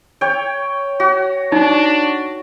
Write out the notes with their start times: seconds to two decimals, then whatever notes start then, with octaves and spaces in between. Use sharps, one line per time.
0.21 C#5 G5
1.00 F#4
1.52 D4 D#4